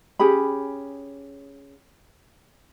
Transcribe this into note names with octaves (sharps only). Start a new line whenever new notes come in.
C#4 G4 G#4 B5